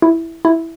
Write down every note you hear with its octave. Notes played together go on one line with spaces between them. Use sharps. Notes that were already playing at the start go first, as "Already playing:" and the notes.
E4
E4